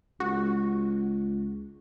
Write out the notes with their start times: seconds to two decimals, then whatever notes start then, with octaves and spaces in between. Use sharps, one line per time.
0.20 C#2 F#4